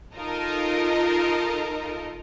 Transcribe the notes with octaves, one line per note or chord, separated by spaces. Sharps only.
D#4 F4 A4 A#4 D#5